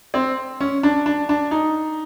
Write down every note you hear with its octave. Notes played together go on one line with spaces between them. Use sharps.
C4
C#4
D4
D4
D4
D#4